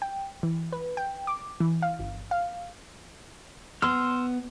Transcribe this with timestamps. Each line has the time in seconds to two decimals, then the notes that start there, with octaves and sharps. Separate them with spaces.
0.02 G5
0.43 E3
0.73 B4
0.97 G5
1.27 D6
1.60 E3
1.82 F5
1.99 G1
2.31 F5
3.82 B3 C6 E6 F6